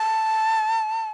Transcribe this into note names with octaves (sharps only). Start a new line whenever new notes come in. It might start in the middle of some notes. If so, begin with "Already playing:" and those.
Already playing: A5